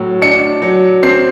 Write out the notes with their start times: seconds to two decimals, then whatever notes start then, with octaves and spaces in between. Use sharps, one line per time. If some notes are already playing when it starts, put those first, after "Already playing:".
Already playing: A2 F#3
0.22 D4 C#7
0.62 F#3
1.03 C4 C7